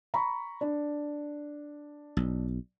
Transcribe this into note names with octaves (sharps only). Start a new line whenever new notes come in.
A#5 B5 C#6
D4
B1